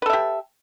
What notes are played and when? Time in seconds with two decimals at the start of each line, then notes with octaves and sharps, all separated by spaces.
0.02 B4
0.06 A4
0.09 E5
0.13 G4